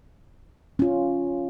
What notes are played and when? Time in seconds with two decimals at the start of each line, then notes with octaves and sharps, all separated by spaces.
0.79 C#4 F4